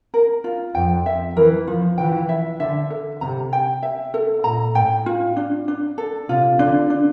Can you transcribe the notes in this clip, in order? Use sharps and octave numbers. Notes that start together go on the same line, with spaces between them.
A#4
F4
F2 G5
E5
E3 A#4
F3 F4
E3 G5
E5
D3 E5
A4
C3 A#5
G5
E5
A4
A#2 A#5
A2 G5
F4
D4
D4
A4
C3 F4
D3 D4
D4